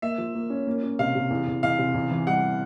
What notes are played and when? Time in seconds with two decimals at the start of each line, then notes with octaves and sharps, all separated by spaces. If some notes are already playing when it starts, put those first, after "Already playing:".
0.02 A#3 E5
0.18 F3
0.35 A#3
0.50 C#4
0.67 A#3
0.83 C#4
0.99 C3 F5
1.15 C3
1.30 E2
1.47 E2
1.63 E2 F5
1.79 C3
1.94 E2
2.10 E3
2.27 G3 F#5